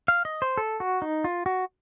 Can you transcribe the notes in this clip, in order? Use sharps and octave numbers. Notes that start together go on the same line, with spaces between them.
F5
D#5
C5
A4
F#4
D#4
F4
F#4